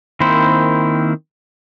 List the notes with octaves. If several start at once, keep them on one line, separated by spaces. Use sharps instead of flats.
D#3 A#3 C4 E4 C5